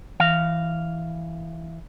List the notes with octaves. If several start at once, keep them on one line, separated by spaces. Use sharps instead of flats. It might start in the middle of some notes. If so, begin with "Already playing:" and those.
E3 F5